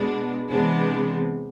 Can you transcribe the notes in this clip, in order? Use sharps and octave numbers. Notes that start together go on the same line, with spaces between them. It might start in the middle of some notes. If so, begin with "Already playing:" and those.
Already playing: B2 G#3 B3 D4
C3 E3 G#3 B3 D4